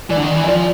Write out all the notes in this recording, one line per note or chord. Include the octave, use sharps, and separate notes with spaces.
E3 D5
D3
D#3
E3
D#5
F3 D5